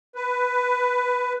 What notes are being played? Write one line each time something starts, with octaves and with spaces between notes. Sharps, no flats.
B4